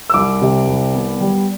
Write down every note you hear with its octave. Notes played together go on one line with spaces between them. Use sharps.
E6
C2 D6
C3
C2
B3
G3